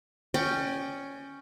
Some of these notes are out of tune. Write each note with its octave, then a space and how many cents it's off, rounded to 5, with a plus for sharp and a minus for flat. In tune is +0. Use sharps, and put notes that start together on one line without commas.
C#4 +0 D5 +35 G5 +0